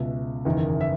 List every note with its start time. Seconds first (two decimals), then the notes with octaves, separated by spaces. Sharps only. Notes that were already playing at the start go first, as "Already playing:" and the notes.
Already playing: C#2 B2 E5
0.45 F#1 E2 D#3
0.81 E5